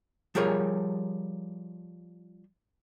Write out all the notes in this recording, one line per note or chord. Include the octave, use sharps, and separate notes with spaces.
F3 G3 G#4 A#4 C#5